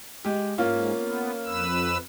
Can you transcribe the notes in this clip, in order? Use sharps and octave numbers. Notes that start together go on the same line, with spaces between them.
G#3 G4
G#2 A#3 C#4 F4
B3
F2 B4 E6